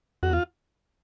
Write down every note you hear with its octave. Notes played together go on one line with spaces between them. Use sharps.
F2 F#4
E2 F4